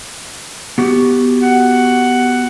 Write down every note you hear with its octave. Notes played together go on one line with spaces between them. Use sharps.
B3 F#4 G4
F#5